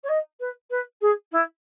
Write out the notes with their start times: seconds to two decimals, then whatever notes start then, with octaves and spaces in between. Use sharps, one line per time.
0.03 C#5
0.08 D#5
0.40 B4
0.70 B4
1.01 G#4
1.32 E4